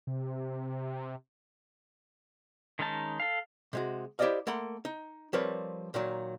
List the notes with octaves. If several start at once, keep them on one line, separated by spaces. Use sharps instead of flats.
C3
D#3 G#3 C#4 D#4 A5
A4 F5
C3 G#3 F#4
E4 G4 C5 D5 D#5 F5
A3 A#3 F#5 B5 C6
D#4
F3 G3 C4 A#4 B4 C#5
A#2 D#3 F#3